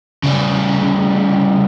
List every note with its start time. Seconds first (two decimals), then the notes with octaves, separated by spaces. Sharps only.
0.23 C#3 G3